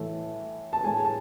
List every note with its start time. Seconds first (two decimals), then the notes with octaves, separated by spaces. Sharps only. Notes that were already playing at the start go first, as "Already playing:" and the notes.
Already playing: A2 E3 A3
0.73 A5
0.84 A2 G#3 G#5
1.05 A5